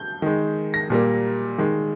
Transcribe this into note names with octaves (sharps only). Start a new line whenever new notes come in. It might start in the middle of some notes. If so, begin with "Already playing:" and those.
Already playing: G6
D#3 G#3
A#6
A#2 G3 A#3
D#3 G#3